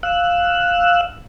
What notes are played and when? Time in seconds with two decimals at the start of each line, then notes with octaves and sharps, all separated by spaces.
0.03 F5 E6 F#6